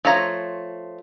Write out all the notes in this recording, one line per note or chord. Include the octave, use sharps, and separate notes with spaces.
F3 A3 C#5 A#5